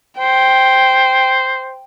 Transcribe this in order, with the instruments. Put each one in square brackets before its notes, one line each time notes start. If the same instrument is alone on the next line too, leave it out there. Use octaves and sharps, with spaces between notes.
[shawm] C5 [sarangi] G5